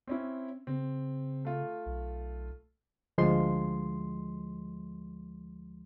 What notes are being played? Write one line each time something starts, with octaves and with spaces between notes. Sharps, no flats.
C4 C#4 E4
C#3 C4
A3 F4
B1
D2 F3 G#3 C6